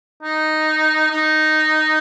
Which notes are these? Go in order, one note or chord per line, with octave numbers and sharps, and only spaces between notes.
D#4
D#4